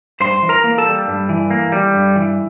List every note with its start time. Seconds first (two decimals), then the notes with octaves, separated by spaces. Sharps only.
0.20 G2 C5 C6
0.42 E3
0.49 A#4 A#5
0.64 A#3
0.78 A4 A5
0.86 G3
1.07 G2
1.29 E3
1.50 A#3
1.72 G3
1.94 G2
2.16 E3